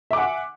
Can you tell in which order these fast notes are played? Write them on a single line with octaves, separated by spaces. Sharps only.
E5 D6 G#5 F#5